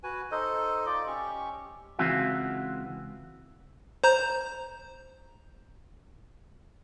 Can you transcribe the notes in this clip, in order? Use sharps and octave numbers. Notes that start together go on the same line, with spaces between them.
F#4 B4 G#5
D#4 A4 C5 D#5
F4 D5 D#5 D6
C#4 G4 C#6
C#2 E3 C4 F4 F#4 E5
C5 A#5 G6